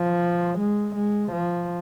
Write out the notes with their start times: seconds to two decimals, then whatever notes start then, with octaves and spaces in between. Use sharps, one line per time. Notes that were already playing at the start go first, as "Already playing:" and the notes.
Already playing: F3
0.59 G#3
0.96 G#3
1.32 F3